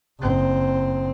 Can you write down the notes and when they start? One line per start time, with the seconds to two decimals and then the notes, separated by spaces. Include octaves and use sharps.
0.20 F#1 C4